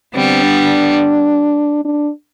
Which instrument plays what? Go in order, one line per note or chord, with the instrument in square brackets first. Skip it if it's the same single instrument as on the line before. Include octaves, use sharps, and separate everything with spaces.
[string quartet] D3 G3 B3 [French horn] C4
[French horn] D4
D4